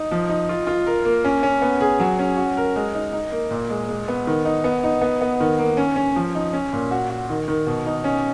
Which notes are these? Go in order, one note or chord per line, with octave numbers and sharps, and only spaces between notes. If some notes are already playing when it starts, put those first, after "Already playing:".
Already playing: D#4
F3
D#4
F4
F4
A#4
A#3
C#4
C#4
B3
G#4
F#3
C#4
F#4
A#4
G#3
D#4
D#4
A#3
A#2
G#3
G#3
B3
D#3
D#4
B3
D#4
B3
B3
D#3
A#3
C#4
C#4
F3
D#4
C#4
A#2
F#4
F#4
D#3
D#3
B2
D#4
C#4